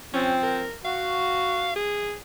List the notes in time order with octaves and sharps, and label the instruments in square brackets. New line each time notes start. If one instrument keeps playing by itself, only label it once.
[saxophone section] F3 C4 [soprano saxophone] C#4
[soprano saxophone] A#4
[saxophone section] F#4 [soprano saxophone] F5
[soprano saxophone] G#4